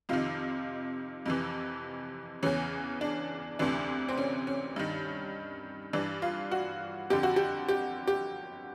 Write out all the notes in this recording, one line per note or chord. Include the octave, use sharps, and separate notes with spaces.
F2 C3 D#3 F4
F2 C3 E3
E2 C#3 E3 C#4
D4
D2 C3 E3 D4
C4
C#4
C#4
G2 D#3
G2 E3 D4
F4
F#4
F2 D3 G4
F#4
G4
G4
G4